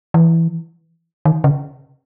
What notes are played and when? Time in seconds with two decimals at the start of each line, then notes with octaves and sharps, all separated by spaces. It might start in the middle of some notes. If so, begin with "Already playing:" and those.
0.14 E3
1.25 D#3
1.44 C#3